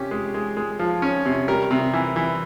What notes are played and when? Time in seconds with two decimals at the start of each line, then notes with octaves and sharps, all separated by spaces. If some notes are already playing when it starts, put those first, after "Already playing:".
Already playing: C3 C#4 G4
0.11 G#3
0.34 G#3
0.57 G#3
0.79 F3
1.02 C#4
1.25 C3
1.48 G3 A#4
1.71 C3
1.93 E3
2.16 E3